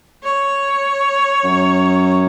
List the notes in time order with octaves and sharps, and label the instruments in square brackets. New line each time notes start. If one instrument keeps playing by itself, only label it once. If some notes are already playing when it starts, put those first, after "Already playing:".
[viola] C#5
[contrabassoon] F#2